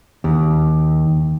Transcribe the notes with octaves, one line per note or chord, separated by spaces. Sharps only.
D#2